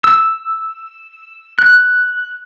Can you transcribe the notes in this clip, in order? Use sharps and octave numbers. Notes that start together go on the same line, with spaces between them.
E6
F#6